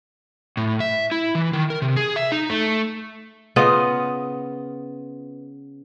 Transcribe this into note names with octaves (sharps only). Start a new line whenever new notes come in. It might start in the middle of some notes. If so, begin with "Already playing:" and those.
A2
E5
E4
E3
D#3
A#4
C3
G#4
E5
D#4
A3
C#3 B3 F4 D#5